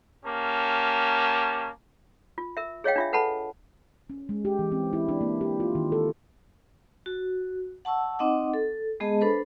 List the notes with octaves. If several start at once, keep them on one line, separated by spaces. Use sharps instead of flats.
A#3 C#4 G4 A5
F4
A#4 E5
G#4 C#5 D#5 F5 G5
D4 F4 E5
A4 B4 F#5 A5 B5
C#4
G#3
G4
E3
C4
E4
D4
A#3
G4
F4
D#3
A4
F#4
F#5 A5 C#6 E6
C4 D#4 D#5 F#5 D6
A4
G#3 B3 G#4 D#5 A5
D4 A4 B4 C5 B5